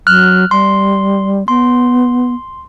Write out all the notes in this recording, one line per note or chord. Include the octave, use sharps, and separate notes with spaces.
F#3 F6 F#6
G3 C6
B3 C6